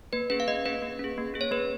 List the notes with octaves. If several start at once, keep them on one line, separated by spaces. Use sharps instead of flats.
A#3 B4
C#4 G#4 B4
F5
A#3 D#5
C#4 G#4 B4
A#3
C#4 G#4
A#3
C#4 G#4
C#5
A#3 B4